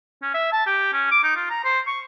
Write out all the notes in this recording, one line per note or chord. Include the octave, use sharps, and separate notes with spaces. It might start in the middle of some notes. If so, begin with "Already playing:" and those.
C#4
E5
A5
G4
C#4
D6
D#4
F4
A#5
C5
C#6